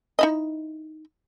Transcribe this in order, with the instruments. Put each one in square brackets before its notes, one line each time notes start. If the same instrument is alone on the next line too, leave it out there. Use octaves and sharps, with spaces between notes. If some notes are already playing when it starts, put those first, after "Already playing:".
[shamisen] D#4 E4 D#5